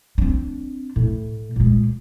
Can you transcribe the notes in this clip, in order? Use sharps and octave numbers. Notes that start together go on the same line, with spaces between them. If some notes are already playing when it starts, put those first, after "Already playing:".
C4 D4
A2
A#2 G#3